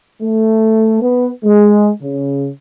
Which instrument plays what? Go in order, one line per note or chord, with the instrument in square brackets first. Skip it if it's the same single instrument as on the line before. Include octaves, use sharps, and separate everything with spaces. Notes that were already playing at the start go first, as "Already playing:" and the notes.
[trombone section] A3
B3
G#3
C#3